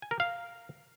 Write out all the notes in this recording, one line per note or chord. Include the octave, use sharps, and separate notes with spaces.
G#5
A#4
F5